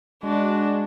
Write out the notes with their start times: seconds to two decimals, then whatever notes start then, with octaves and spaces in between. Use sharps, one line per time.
0.23 G#3 D4 F#4